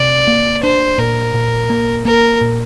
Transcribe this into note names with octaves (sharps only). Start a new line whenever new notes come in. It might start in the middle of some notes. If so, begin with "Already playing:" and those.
Already playing: C3 D5
A#3
D4 C5
A#2 A#4
A#2
A#3
A#3 A#4
A#2